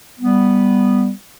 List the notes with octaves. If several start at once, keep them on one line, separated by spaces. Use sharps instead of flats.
G3 B3